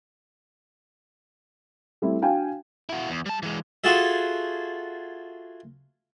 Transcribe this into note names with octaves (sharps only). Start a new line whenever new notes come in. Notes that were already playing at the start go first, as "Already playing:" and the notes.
G3 A3 C4 E4
D4 F#4 F5 G5 G#5
E4 F#4
E2
G3 A5
E3 G#3
F4 F#4 G#4 A4 E5